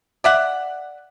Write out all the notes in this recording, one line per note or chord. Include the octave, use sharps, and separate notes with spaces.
D5 E5 F#5